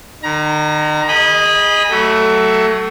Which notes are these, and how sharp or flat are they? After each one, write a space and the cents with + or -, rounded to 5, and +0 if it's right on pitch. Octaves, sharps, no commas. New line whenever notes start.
D#3 -40 A#5 +20
G#4 -25 D#5 +0 B5 -25
F#3 +30 A3 +10